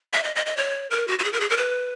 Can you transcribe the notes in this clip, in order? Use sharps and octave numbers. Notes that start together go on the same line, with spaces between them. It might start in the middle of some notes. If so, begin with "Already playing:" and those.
E5
D#5
D#5
D#5
C#5
A#4
F#4
F#4
G#4
A#4
G#4
A#4
B4